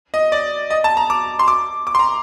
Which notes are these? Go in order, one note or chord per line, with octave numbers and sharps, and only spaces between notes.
D#5
D5
D#5
A5
A#5
D6
C6
D6
D6
C6
A#5